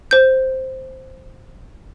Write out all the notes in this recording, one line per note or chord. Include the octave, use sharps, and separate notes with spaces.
C5 G6